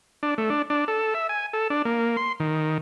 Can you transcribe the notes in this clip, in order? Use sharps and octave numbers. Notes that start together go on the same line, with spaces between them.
D4
A3
D4
D4
A4
E5
G#5
A4
D4
A#3
C6
D#3